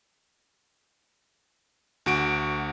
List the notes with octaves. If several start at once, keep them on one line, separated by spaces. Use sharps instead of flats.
D2 F#4 D7